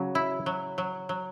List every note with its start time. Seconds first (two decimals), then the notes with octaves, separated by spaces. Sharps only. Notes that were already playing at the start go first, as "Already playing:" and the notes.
Already playing: C#3 F#3
0.15 E4
0.46 F#3
0.78 F#3
1.09 F#3